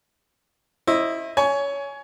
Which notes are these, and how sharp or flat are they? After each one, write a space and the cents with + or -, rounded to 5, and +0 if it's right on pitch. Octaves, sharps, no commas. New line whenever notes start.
E4 +0 C5 +40 D#5 +0
C#5 +20 G#5 +15